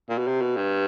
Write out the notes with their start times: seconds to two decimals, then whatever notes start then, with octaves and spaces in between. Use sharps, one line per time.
0.09 A#2
0.18 B2
0.27 C3
0.41 B2
0.56 G2